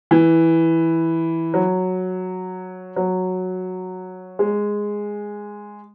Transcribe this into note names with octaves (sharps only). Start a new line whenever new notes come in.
E3
F#3
F#3
G#3